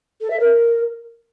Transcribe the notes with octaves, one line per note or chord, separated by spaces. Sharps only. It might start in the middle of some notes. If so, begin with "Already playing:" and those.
A4
E5
A#4